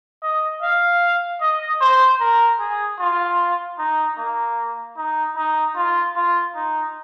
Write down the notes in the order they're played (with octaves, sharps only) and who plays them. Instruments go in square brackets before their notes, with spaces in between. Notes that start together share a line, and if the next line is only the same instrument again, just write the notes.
[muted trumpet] D#5
F5
D#5
C5
A#4
G#4
F4
D#4
A#3
D#4
D#4
F4
F4
D#4